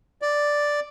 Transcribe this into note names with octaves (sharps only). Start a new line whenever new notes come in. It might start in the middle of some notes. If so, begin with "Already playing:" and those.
D5